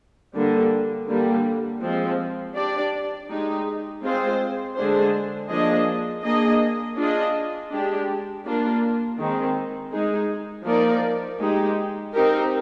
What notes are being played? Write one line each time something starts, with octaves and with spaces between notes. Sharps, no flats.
D3 G3 A#3
D3 G3 A#3
F3 G#3 C4
D4 G4 D5
G#3 D#4 G4
G#3 C4 F4 G#4 C5
D3 G#3 D4 G#4 C5
F3 A#3 D4 G#4 D#5
A#3 D4 G#4 D#5
D4 F4 G#4 D#5
G#3 D4 G4
A#3 D4 F4 A#4
D#3 G#3 C4
G#3 D#4 G#4
F3 A#3 D#4 A#4 D5
G#3 D#4 G4
C4 D#4 G4 A#4